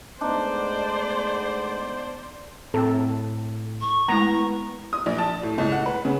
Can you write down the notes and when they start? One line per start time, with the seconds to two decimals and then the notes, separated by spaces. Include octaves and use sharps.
0.21 G#3 A3 B3 D4 D#4 C5 D5
2.74 A2 C4 A4 G5
3.81 C#6
4.08 G#3 A3 B3 E4 A#5
4.93 D#6
5.06 A#1
5.18 A5
5.43 A2
5.58 C#2
5.72 F#5
5.86 B4
6.05 C#3